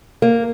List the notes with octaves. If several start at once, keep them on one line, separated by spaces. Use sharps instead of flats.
A#3